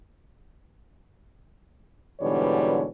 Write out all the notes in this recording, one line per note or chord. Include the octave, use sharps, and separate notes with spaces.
G#2 B2 D3 E3 G3 C#5